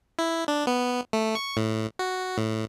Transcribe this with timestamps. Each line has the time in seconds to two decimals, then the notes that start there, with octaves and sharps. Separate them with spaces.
0.19 E4
0.48 D4
0.67 B3
1.13 A3
1.35 C#6
1.57 A2
1.99 F#4
2.38 A2